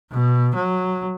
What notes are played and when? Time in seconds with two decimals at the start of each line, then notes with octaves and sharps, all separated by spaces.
0.12 B2
0.55 F#3